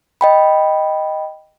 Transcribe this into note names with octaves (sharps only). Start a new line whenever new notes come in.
D#5 G5 B5